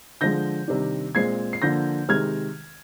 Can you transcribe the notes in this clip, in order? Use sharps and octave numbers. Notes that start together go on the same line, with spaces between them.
D3 F3 G#3 G6 A#6
C3 D#3 G3 D4
A#2 G#3 C4 G#6 C7
C7
D3 F3 A#3 G6 A#6
C3 D#3 G#3 F6 G#6